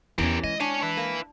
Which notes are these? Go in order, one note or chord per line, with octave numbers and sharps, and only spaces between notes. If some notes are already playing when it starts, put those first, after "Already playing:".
E2 E3 C#4 G4 A#4
G#3 D#5
D4 C#5 G#5
E4 B4
A#3